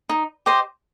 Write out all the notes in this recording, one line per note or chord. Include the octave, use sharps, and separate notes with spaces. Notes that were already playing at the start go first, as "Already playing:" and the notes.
D#4
G4 C5 D#5